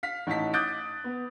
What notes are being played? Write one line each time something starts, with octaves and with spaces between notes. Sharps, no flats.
F5 B6
A1 D#4 A5 B6
D6 D#6 F#6 G6 A6 D7
B3